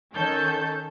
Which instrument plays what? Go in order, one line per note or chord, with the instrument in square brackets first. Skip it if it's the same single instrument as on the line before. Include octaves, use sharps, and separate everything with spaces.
[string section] D#3 C#4 A4 G6